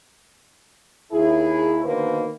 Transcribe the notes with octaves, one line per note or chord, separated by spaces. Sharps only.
D#2 E4 G#4
B2 D3 D#3 A#3 B4 C5